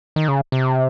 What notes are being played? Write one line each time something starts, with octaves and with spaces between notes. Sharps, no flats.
D#3
C#3
C3